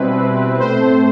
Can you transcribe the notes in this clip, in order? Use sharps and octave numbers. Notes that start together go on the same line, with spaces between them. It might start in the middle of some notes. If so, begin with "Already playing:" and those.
Already playing: B2 G3 C4 E4 B4
C4
C4
A2 C5
A3